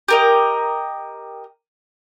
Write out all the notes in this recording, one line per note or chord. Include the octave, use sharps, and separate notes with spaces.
G4 A#4 D#5